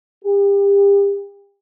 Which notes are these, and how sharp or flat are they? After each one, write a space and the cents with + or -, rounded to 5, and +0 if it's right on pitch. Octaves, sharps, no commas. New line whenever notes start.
G4 +35